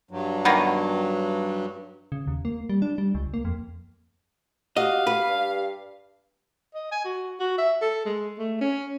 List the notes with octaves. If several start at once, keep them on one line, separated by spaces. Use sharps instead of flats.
G2 F#3
D#3 A#3 B3
C#3
D#2
A#3
G3
D4
G3
C#2
A#3
F2
F#4 G4 D#5 F5
B4
G2
D#5
G#5
F#4
F#4
E5
A4
G#3
A3
C#4